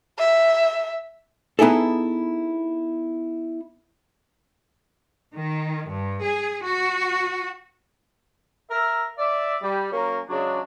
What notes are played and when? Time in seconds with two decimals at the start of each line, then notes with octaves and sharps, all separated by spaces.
0.19 E5
1.59 B3 D#4 E4 G#4 A4
5.35 D#3
5.90 G2
6.25 G#4
6.65 F#4
8.71 A#4 E5
9.18 D5 E5
9.62 G3 G4
9.92 F#3 A#3 C#4 A#4
10.29 C#3 F#3 G#3 D4